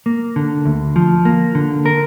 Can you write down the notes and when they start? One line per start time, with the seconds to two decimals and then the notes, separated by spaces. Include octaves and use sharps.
0.06 A#3
0.36 D3
0.65 D2
0.96 F3
1.25 A#3
1.55 D3
1.86 A#4